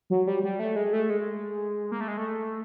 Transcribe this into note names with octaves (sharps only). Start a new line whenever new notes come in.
F#3
G3
G3
A3
G#3
A3
G#3
A#3
A3
G#3
A3